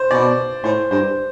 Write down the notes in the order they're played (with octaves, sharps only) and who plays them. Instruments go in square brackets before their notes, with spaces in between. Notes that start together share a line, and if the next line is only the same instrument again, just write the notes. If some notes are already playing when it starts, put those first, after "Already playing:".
Already playing: [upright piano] C5
[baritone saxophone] B2 [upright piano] D5
[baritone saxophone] A2 [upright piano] C5
[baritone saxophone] G2 [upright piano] C5